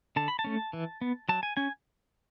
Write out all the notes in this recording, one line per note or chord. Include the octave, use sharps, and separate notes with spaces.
D3 A5
B5
A5
A3 C#4
E3
B3
F#3 A5
G#5
C#4 G#5